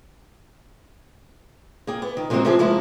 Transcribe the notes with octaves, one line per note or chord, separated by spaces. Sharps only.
A#3 G#4 G5
B3
D#3
C3 E3 G#3 A#3 C4 F#4
C3 F3 C4 E4 G4 G#4
C3 F3 G#3 A#3 B3 E4